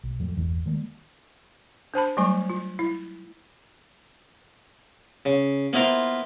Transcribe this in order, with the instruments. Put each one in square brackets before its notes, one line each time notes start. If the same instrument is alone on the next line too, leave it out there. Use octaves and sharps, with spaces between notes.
[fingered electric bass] B1
F2 A2 F#3
G1 E2 E3
D#3 G3 G#3 A#3
[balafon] D4 C5 A5 B5
F#3 G3 A3 G#5 C#6
F4
E4
[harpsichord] C#3
A#3 B3 E4 F4 A#4 C5